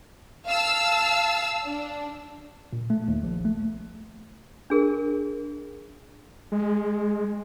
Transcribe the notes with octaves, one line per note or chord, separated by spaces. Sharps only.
F5 A5 E6
D4
A#2
A3
D#2
A#1
A3
D4 G#4 A#4
G#3